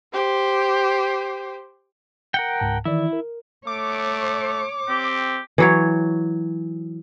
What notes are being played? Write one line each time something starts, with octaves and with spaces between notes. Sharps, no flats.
G4 C5
A#4 F#5 G5 C#7
C#2 G#2 A5
D#3 E3 E4 D5
A#4
A3 C#5 D6
C4 G4
E3 F#3 C#5